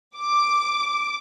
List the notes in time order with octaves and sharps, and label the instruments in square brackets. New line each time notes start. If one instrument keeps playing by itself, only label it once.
[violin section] D6